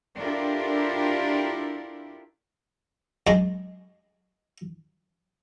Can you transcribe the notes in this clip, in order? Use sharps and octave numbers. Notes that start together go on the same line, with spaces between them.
D4 E4 F4 G4 A4 A#4
F#2 G#3